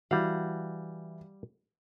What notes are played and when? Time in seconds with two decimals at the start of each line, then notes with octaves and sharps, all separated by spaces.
0.11 E3 G3 F#4 F5